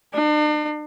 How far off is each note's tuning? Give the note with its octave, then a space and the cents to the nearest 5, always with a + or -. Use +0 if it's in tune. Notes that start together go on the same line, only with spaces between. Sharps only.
D4 +45